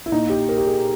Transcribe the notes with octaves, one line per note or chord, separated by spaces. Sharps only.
E4
A#2 D#4
G4
A#4
G4
G#4